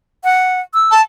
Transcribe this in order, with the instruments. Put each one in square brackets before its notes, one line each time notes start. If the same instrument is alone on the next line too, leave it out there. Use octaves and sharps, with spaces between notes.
[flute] F#5
E6
[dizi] A5